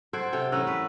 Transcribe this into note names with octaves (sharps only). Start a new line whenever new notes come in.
A4 C5 F#5 G#6 D7
C3 A4 G5
E3 A3 C#4 A#4 E6 F#6
B4